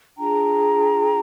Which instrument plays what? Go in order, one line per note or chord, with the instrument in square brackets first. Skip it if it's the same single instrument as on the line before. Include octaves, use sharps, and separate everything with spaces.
[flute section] D4 F4 G#4 G5 A#5